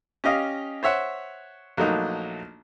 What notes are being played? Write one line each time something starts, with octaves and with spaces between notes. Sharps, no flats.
C#4 G4 D#5 F5
C5 C#5 E5 F#5
A#1 F#3 A3 A#3 D#4